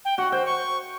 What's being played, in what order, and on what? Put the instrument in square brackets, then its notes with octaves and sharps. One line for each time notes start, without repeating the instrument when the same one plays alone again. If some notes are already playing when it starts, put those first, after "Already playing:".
[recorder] G5
[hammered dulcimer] F#4 [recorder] F#5
[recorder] C5 [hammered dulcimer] G5
[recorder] C#6